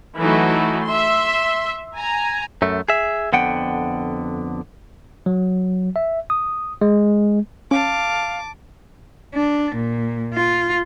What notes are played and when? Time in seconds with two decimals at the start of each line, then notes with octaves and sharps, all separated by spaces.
0.18 E3 F#3 A3 D#4 F#4
0.87 E5 C6
1.95 G#5 A#5
2.62 F#2 A3
2.89 G#4 E5
3.33 F2 D3 B3 F#5 G5
5.26 F#3
5.96 E5
6.30 D#6
6.81 G#3
7.71 C#4 F5 A5 D6
9.34 D4
9.76 A#2
10.34 F4